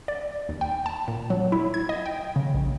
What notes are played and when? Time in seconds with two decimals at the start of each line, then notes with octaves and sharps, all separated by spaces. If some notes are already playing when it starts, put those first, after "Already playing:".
0.08 D5
0.49 D#2
0.61 G5
0.86 A5
1.08 A#2
1.30 F#3
1.52 E4
1.74 G#6
1.89 D#5
2.06 G5
2.36 C#3
2.54 A#1